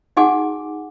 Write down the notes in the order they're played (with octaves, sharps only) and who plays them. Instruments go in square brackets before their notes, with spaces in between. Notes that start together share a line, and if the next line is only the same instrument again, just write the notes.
[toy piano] D#4 F#4 G#4 F#5 G#5 D6